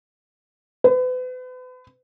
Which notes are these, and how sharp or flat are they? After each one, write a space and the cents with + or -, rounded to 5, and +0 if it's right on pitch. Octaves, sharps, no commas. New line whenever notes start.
B4 +40